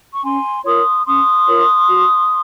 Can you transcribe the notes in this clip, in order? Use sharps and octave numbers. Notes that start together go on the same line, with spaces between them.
C#6
C#4 G#5 C6
F4 A#4 C#5 C6 D#6
C#4 C6 D#6
F4 A#4 C#5
F#4